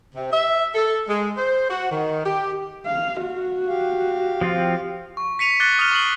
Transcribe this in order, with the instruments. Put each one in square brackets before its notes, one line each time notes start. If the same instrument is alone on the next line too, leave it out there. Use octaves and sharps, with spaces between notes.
[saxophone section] C3
E5
A4
G#3
C5
F#4
D#3
G4
[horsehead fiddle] F5
F#4
[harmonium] G4 F5
[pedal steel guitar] F3 C4 F4
[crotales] C#6
B6 C#7 D#7 F7
D6 F#6 A6 C#7 G7
D#6 F6 F#6 A6 F7 G7
C#6 C7 F#7 G7